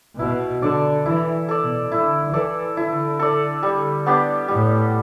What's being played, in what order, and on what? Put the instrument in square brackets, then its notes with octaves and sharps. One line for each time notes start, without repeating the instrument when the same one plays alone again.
[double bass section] B2 [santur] E4
[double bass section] D3 [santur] A4 D5
[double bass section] E3 [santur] E4
[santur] A4 D5
[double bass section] B2
[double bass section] D3 [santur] E4
[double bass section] E3 [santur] A4 D5
[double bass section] D3 [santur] E4
[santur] A4 D5
G3
B3 D4 G4
[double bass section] A2 [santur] G3